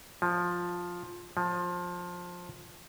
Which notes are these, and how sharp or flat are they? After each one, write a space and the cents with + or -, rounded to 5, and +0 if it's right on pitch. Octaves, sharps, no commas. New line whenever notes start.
F3 +10
F3 +20